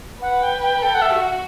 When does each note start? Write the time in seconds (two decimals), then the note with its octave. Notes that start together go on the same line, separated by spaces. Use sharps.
0.22 B4 F#5
0.43 G5
0.62 G5
0.82 A4 G5
0.95 F#5
1.02 E5
1.12 F#4
1.21 F#5